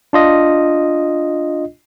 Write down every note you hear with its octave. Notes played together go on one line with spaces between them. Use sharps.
D4 F4 D#5